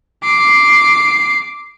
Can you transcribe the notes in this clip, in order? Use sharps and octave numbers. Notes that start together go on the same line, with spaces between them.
D6 C7